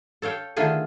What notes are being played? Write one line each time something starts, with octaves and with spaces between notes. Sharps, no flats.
A4 C#5 F5 G5
D3 D#3 A3 F4 G#4